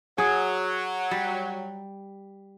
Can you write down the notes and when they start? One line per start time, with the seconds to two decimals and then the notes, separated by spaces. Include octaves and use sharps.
0.18 F#3 G#4
1.11 G3